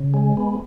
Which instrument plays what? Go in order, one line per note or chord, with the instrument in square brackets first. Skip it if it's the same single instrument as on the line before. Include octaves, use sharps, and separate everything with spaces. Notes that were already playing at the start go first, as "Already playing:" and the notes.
Already playing: [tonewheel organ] C#3
G#3
B3